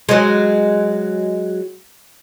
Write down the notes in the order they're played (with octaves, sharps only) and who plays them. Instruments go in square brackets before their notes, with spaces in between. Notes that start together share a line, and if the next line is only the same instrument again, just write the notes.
[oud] F#3 G#3